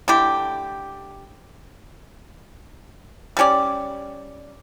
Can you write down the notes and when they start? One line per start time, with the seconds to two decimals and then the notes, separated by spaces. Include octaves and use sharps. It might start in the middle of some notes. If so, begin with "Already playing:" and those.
0.08 D3 A3 E4 G4
3.37 G3 C#4 G4 D5